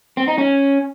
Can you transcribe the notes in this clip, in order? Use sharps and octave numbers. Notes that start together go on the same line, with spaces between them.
C4
D#4
C#4